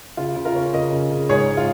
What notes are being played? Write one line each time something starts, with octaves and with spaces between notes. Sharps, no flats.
C#3 F4
C#3
F4 A#4
C#4
C#3 A#4 D#5
C#3
C#3
G#2 G#4 C#5
F4